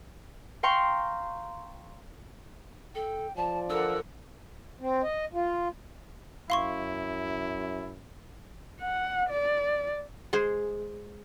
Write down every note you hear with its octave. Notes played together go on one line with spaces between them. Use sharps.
F5 G5 A#5 C6 C#6
A4 G5
F3 D5 A5
D3 A#4 F#5 E6
C4
D#5
F4
F#2 E4 F5 C6 C#6
F#5
D5
G#3 G#4 C5